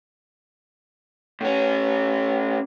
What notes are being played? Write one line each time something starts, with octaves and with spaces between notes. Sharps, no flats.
A2 C#4